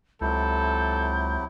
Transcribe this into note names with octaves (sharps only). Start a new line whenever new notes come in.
C#2 C3 F#3 E4 A4 G6